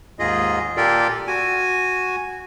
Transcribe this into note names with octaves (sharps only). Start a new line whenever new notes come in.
D#2 G#2 F4 G#4 D#5
A#2 F4 G4 A4 A#4 D5
F#4 G#5